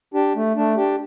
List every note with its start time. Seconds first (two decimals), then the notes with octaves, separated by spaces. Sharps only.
0.14 D4 G4
0.36 A3
0.56 A3 D4
0.77 D4 G4